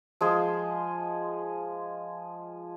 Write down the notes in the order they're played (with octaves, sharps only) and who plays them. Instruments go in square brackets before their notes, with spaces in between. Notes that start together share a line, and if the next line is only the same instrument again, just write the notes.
[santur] F3 G#3 G#4